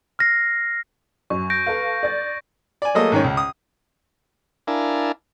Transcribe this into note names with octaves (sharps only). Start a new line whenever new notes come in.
F6 A#6 C7
F#2 C#6
G6 A#6 D7
A4 B4 F5
D5 A6
D5 G#5
F#3 A3 A#3 G#4 A4 D#5
G#2 D#3 C#4
C#2
D#6
D4 E4 A#4 F5 G#5 A5